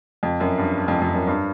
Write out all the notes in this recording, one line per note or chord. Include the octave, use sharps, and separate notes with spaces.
F2
F#2
G2
F2
F2
F#2
G2